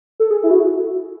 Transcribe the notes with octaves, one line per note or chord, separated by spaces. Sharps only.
A4
G#4
E4
F#4